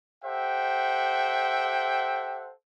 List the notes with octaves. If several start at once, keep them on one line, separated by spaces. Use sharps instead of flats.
G4 A4 C5 E5 F#5 G5